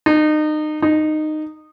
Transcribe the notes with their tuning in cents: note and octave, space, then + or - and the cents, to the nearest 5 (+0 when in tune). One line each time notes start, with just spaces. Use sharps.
D#4 -30
D#4 -15